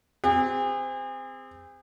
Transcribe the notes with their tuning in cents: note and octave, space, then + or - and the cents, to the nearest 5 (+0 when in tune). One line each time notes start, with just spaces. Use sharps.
C4 -20 G#4 -40